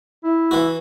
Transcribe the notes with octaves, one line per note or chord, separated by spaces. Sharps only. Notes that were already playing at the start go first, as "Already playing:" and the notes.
E4
E3 F#4